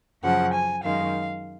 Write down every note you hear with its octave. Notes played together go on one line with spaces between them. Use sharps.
F#2 C#3 F3 F#5
G#5
F#2 D#3 G#3 F5